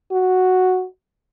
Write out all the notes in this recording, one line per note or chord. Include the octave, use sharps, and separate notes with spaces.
F#4